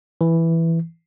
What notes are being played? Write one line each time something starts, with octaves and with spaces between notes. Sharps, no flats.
E3